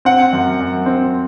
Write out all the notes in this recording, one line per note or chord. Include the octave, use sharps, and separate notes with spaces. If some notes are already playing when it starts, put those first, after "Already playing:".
C4 F#5
F#2
F#2
C4